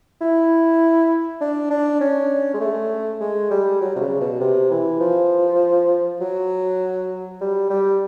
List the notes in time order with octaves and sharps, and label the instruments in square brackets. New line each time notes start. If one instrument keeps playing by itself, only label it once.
[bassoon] E4
D4
D4
C#4
G#3
A3
G#3
G3
F#3
C3
C#3
B2
C3
E3
F3
F#3
G3
G3